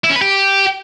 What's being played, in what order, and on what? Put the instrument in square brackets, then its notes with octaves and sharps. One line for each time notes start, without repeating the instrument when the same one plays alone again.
[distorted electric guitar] E4
C#4
B4
G4